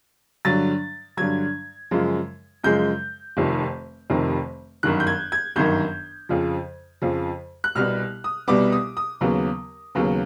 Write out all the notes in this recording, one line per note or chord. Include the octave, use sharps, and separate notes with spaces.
G2 D3 F#3 A6
G2 D3 F#3 G#6
F#2 C#3 F3 G#3
F#2 C#3 F3 G#3 G6
F1 F2 C3 D#3
F1 F2 C3 D#3
G1 F#2 D#3 F#6
G6
G#6
G#6
G1 F#2 D#3 G6
F2 C#3 F3
F2 C#3 F3
F#6
C2 B2 G3 B3 F6
D#6
C2 B2 G3 B3 D6
D#6
D#6
D#2 C#3 F#3 B3
D#2 C#3 F#3 B3